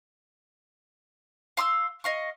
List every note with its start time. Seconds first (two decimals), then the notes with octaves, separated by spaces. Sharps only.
1.57 F5 C6 D#6 E6
2.04 D#5 F5 C#6